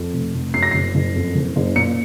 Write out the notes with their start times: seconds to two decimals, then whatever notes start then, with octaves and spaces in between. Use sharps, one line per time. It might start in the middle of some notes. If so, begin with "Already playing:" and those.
Already playing: F2
0.14 F1
0.35 F1
0.54 F#2 C7
0.63 A#6
0.71 F#1 C7
0.95 F#1
1.16 F2
1.35 F#1
1.56 F#1
1.76 A#2 C#7